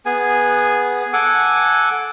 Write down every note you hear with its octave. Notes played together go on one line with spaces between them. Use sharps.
B3 G#4 G#5
A4 F#5 G#5 D6